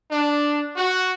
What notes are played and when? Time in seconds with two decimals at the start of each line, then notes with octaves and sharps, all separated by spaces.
0.12 D4
0.77 F#4